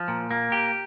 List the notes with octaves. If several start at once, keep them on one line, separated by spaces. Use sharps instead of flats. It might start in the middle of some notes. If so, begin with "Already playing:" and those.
Already playing: F3
A#2
A#3
G4